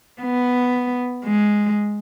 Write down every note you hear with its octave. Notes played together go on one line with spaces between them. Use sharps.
B3
G#3